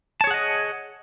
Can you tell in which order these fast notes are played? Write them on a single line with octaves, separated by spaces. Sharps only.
A5 C#5 G#4 F#5 D#5